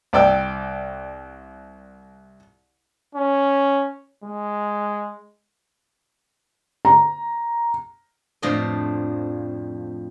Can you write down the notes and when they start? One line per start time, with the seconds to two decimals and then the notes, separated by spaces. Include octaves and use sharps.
0.13 C2 D5 G5 E6
3.15 C#4
4.24 G#3
6.85 A#5
8.42 F2 A2 F3 D4 D#5